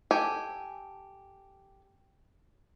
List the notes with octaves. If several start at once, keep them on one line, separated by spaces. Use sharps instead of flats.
G4 A4 G#5